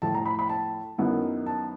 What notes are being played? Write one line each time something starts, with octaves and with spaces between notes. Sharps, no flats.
A2 F3 A3 A5
A#5
B5
B5
A5
F#2 D#3 F#3 B3 E4
A5